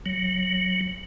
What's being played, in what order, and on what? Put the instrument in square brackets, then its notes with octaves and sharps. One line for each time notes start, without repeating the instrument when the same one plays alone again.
[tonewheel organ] F#3